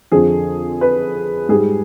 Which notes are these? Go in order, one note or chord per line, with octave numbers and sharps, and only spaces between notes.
F2 D3 F3 G#4
B4
G#2 G3 G#4